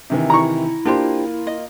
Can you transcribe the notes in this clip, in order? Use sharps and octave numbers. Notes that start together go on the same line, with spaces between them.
C3 D#3 E3
E4 A#5 C#6
A#3 D4 F4 G4 C5
D#5